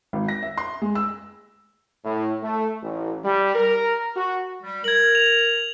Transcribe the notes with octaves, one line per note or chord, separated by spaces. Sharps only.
G#1
A#6
E5
C6
G#3
E6
A2
A3
A1
G3
A#4
F#4
G3
A#4 G#6 F#7
F7